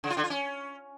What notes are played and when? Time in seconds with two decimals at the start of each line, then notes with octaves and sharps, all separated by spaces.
0.04 C#3
0.10 F4
0.17 D3
0.24 F4
0.30 C#4